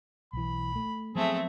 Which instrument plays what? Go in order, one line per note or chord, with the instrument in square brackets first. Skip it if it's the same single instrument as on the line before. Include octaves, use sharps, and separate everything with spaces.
[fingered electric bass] B1 E3 [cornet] B5
[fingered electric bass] A3
[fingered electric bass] F3 F#3 B3 [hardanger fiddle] A3 C4 [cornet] G#4